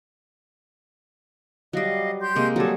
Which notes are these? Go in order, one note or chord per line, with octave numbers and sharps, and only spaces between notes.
F#3 G3 D#5 F5
G4 C6 G6
C3 G#3 A#3
F#3 G3 G#4 A4